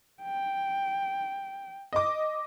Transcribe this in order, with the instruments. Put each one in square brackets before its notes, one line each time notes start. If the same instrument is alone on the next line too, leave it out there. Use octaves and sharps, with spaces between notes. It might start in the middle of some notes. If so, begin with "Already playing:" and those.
[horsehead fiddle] G5
[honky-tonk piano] D#5 D6